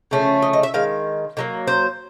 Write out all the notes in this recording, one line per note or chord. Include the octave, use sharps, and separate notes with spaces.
C#3 F3 A3 C#4
D#5
D#5
E5
D#3 G#3 F5
D3 F#3 A#3
C5